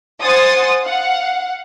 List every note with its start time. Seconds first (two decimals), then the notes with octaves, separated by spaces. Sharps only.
0.23 C5 F#5 G#5 C6 D#6 A6
0.82 F5 F#5